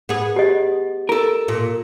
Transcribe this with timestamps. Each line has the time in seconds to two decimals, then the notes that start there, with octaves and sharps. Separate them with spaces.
0.09 B3 G#4
0.36 G4 D#5
1.09 A4 A#4
1.48 A#2